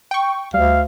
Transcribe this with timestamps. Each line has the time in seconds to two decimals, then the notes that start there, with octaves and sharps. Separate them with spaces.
0.11 G5 C#6
0.54 D2 G3 F5